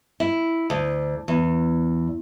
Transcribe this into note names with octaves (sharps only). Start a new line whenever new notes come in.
E4
D2
E2